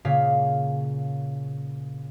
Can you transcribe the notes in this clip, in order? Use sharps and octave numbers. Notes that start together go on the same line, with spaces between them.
A#2 C#3 A#3 G#4 F5 B6